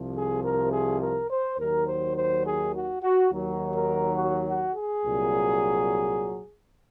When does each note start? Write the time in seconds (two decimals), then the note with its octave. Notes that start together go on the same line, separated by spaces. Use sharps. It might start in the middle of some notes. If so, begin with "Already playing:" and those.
Already playing: C2 C3 F3
0.16 G#4
0.44 A#4
0.72 G#4
1.01 A#4
1.30 C5
1.58 D#2 D#3 F#3 A#4
1.87 C5
2.16 C5
2.45 G#4
2.74 F#4
3.03 F#4
3.31 D#2 D#3 F#3
3.75 A#4
4.17 F#4
4.46 F#4
4.74 G#4
5.03 C2 A#2 F#3